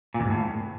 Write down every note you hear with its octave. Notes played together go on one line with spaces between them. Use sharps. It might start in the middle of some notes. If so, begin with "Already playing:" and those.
A#2
E2
G#2
A2